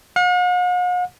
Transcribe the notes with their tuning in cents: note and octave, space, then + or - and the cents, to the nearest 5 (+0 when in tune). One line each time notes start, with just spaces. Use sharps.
F#5 -45